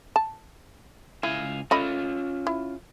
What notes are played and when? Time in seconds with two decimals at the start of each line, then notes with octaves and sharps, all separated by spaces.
0.16 A5
1.23 C#2 E4 F5 G#5
1.71 A3 C#4 F4 D#5 B5
2.47 E4